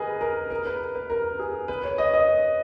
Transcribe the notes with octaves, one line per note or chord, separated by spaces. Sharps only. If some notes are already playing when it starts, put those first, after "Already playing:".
Already playing: G#4 A#4 B4 D#5
A#4
A#4
B4
B4
A#4
G#4
B4
C#5
D#5
D#5